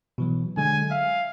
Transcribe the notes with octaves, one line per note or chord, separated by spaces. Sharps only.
B2 E3 F#3
D3 F#3 G#3 G#5
E5 F5